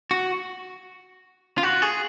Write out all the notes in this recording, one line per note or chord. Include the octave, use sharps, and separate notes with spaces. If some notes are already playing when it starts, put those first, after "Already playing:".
F#4
F4
F#4
G#4